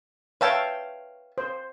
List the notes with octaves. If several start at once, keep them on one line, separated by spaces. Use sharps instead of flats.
B4 C#5 E5 F5 G5 A5
C5